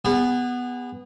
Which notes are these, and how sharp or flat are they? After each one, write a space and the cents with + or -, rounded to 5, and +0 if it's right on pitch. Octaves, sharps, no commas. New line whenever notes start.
B3 +0 G#4 -35